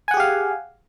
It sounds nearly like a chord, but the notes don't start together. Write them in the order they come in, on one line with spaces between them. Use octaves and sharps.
G#5 F#5 G#4 G4 F5